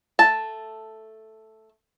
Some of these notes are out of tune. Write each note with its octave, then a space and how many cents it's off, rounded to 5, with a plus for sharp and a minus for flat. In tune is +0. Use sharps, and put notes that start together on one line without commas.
A3 +0 A5 +0